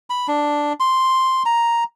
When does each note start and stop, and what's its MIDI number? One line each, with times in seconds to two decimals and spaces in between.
0.10 0.27 83
0.28 0.73 62
0.80 1.43 84
1.45 1.84 82